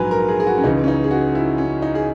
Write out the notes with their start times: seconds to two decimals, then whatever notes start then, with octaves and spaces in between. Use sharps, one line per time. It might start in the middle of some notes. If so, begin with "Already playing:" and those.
Already playing: A#1 G#2 F#3 B4 G#5 A#5
0.11 A#4
0.28 G#4
0.40 G#4
0.47 F#4
0.58 C#4
0.64 C#2 C#3 E3 D#4
0.84 C#4
0.88 D#4
1.04 G#4
1.11 F#4
1.35 E4
1.58 C#4
1.82 D#4
1.95 G#4